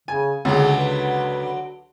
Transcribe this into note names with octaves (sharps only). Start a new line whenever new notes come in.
C#3 G#5
C#2 D3 F#3 G#4
B4